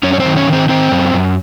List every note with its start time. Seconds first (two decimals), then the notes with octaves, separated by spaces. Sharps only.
0.03 F#2 C#4 C#5
0.14 C#5
0.20 C4 C5
0.25 D#3
0.36 C#4 C#5
0.47 D#3
0.53 C4 C5
0.69 D#3 C4 C5
0.91 F#2
1.14 F#2